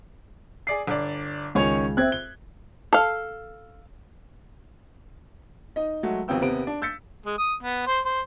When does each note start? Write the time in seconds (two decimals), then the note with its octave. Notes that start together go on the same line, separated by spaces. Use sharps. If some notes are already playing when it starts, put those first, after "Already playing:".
0.67 G#4 D5 C7
0.87 G1 D5
1.55 C#2 D#3 C#4 C#5
1.97 C4 C5 E5 F#6 G#6
2.12 G7
2.93 A4 F5
5.76 D#4 D#5
6.03 F#3 G#3 A3 F#4
6.28 G#1 F2 C3 B3 G5 E6
6.40 D#2 C3 B3 D7
6.67 D4
6.82 E6 G6 A6 B6 C#7
7.26 G#3
7.38 D#6
7.63 B3
7.87 C5
8.05 C5